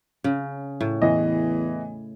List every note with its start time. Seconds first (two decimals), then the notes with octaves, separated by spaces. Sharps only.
0.24 C#3
0.81 A2
1.02 E2 E3 D#5